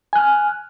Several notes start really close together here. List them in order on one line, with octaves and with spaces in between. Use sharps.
G#5 F#6 F6